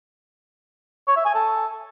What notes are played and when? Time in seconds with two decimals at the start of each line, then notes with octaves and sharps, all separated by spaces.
1.08 C#5
1.16 E5
1.25 G#5
1.34 A4